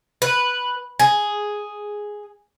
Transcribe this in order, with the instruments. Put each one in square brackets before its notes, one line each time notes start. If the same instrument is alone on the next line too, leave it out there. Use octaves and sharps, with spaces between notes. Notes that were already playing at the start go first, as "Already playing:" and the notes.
[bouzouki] B4
G#4